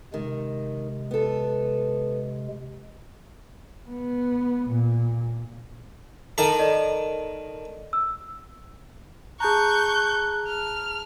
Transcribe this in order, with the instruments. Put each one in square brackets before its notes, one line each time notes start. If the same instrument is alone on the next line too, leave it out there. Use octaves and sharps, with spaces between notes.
[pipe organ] C3 G#3 [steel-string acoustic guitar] D#3
[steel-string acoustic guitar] B3 A4
[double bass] B3
A#2
[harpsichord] D#3 A5 A#5 [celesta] A4
[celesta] A4 D5 D#5
E6
[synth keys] G#4 A5 A#5 [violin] C#6 G6 [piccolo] F#6
[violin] F6